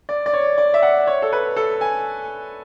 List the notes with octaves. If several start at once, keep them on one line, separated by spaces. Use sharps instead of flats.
D5
D5
C#5
D5
E5
F#5
C#5
A4
B4
A4
G#5